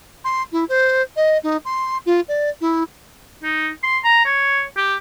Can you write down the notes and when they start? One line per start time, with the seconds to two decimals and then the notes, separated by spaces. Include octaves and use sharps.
0.24 C6
0.52 E4
0.69 C5
1.16 D#5
1.43 D#4
1.65 C6
2.06 F4
2.28 D5
2.61 E4
3.43 D#4
3.83 C6
4.04 A#5
4.25 C#5
4.77 G4